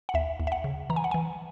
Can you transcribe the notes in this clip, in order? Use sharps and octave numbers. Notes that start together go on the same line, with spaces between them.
F#5
D#2 E5
D#2
E5
F#5
C#3
E3 A#5
G#5
F#5
E3 G#5